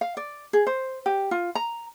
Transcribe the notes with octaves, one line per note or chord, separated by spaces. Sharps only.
F5
D5
G#4
C5
G4
F4
A#5